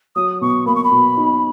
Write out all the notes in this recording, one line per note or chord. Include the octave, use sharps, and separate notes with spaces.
F#3 D#6
B2 C#6
A#3 B5
C#6
B5
B2
D#4